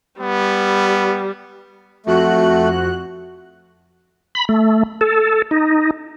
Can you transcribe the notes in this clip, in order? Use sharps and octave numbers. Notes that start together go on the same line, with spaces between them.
G3 B3
F2 A3 F#4 F#6
B5
A3
A4
D#4